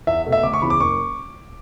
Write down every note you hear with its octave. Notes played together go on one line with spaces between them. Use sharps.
E2 E5
B2 A3
E5
D2 D6
C#6
C#3 E3 B3 B5
D6
F#1 C#6